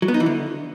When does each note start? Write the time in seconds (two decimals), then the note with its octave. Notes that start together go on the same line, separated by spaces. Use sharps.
0.02 F#3
0.08 B3
0.14 D#4
0.20 E3
0.26 D3